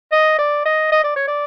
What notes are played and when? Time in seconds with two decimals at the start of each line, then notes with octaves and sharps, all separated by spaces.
0.12 D#5
0.38 D5
0.65 D#5
0.92 D#5
1.04 D5
1.16 C#5
1.27 D5